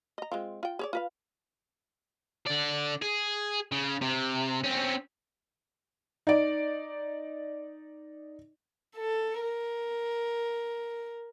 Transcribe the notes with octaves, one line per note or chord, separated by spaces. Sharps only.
D#5 A#5
G#3 C4 F4
F4 G5
G#4 C#5 D5
F4 B4 F5
D3 D5
G#4
C#3
C3
C4 C#4
D#4 D5
A4
A#4